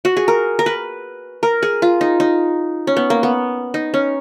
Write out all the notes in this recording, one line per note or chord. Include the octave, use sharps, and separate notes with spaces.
F#4
G#4
A#4
A#4
B4
A#4
G#4
F4
D#4
D#4
C#4
B3
A#3
B3
D#4
C#4